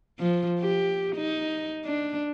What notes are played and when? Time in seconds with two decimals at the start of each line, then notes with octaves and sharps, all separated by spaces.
0.19 F3
0.60 G4
1.16 D#4
1.85 D4